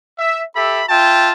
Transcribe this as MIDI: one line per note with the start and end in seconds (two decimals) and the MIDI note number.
0.19 0.42 76
0.56 0.82 67
0.56 0.82 69
0.56 0.82 76
0.56 0.82 83
0.89 1.31 65
0.89 1.31 76
0.89 1.31 79
0.89 1.31 81